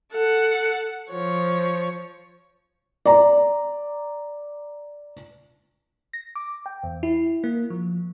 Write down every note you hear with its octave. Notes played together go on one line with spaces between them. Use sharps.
A4 F#5
F3 C#5
D5 A#5
A#6
D6
G5
E2
E4
A#3
F3